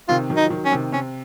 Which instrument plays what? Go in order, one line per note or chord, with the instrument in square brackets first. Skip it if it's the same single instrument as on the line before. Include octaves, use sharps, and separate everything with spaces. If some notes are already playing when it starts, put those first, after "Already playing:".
[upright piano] C3 D#3 [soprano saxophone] F4
[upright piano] D#3 F#3
[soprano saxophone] D#4
[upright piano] F3
D#3 F#3
[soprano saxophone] C#4
[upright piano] C3 D#3
[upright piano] C3 [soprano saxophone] C#4